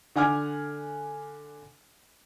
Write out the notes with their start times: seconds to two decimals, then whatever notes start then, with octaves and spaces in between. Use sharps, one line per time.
0.16 D3 F#5 G#5 D6 F6 G#6